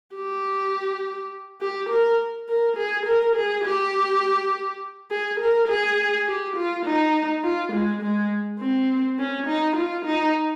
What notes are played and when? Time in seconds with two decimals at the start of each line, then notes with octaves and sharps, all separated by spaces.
0.15 G4
1.61 G4
1.89 A#4
2.49 A#4
2.77 G#4
3.06 A#4
3.36 G#4
3.64 G4
5.11 G#4
5.40 A#4
5.68 G#4
6.27 G4
6.56 F4
6.86 D#4
7.44 F4
7.73 G#3
8.02 G#3
8.60 C4
9.19 C#4
9.47 D#4
9.76 F4
10.05 D#4